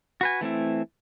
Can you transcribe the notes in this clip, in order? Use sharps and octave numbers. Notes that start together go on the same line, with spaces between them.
F#4 B4 G#5
E3 A3 C4 E4